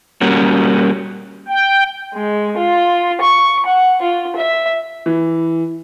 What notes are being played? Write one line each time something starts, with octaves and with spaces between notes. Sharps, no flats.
G3 A#3 C#4 F#4
G5
G#3
F4
C#6
F#5
F4
E5
E3